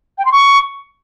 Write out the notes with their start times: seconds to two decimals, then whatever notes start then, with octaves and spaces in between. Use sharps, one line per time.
0.18 G5
0.25 C6
0.32 C#6